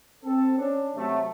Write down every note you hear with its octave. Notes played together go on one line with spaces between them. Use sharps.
C4 A4
C#4 D4
C3 F#3 A3